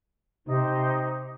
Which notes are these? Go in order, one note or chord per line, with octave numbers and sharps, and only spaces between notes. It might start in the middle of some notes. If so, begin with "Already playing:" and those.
C3 D#4 G4 C5